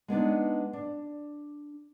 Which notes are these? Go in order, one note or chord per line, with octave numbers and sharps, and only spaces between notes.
G#3 B3 D4 D#4
D4